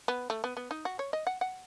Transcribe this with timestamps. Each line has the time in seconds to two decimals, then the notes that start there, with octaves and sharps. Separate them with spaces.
0.08 B3
0.30 A3
0.44 B3
0.57 B3
0.71 D#4
0.85 F#4
0.99 C#5
1.13 D#5
1.27 F#5
1.41 F#5